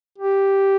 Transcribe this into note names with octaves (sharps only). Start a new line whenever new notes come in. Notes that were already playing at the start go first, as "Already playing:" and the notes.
G4